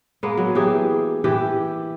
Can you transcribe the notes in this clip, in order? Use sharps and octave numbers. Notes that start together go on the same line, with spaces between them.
G#3 A#3 B3
F#3
E3 G4 G#4
E3 G4